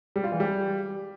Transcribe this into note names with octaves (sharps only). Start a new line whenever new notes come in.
G3
F4
E3
G3